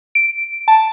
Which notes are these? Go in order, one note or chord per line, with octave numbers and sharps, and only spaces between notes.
D7
A5